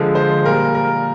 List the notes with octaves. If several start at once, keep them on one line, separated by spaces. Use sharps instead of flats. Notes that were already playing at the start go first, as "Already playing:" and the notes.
Already playing: D3 F3 G#3
C5
A#2 G3 A#4
A#4